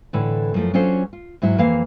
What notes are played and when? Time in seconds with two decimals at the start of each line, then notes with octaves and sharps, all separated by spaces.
0.13 A2 D3 E3
0.54 F#2 F3 A3
0.74 F#3 C#4 D4 F4 A4 C5
1.13 F4
1.42 G#2 F#3 E4 F#4
1.58 F2 E3 A#3 F5